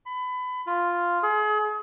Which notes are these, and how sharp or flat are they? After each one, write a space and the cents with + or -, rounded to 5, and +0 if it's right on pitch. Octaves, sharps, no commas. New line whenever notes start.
B5 +25
F4 +0
G#4 +35